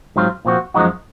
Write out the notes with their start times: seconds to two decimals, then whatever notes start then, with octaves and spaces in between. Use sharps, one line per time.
0.16 G#2 F#3 C4 F4
0.45 A#2 F3 C4 F#4
0.74 F#2 F3 G#3 D#4 F#4